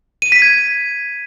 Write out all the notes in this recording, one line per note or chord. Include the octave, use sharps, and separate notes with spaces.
D#7
B6
G#6